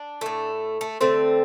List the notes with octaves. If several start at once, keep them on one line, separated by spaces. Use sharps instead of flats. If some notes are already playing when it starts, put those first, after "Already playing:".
Already playing: D4
A2 A3
A3
D3 A3 C4